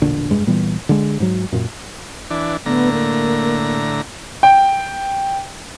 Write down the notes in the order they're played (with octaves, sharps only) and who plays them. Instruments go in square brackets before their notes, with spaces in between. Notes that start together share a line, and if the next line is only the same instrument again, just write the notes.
[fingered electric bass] E1 A#1 D3
F1 G2 G#3
A#2 E3 G3 B3
D3 G#3
G#2 F#3
F#2 A#2
[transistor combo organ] E3 D4
[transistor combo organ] A2 D3 A#5 [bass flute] B3
[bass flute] A#3
[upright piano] G5